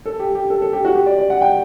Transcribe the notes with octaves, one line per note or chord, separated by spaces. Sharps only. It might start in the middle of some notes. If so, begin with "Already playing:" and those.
A4
G4
G4
A4
A4
G4
F#4
G4
D5
D5
F#5
G5